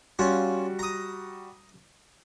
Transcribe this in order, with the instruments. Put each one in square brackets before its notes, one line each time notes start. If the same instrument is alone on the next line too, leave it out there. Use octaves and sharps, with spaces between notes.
[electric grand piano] G3 F#4 [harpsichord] C#4 F4
[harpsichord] A#5 D#6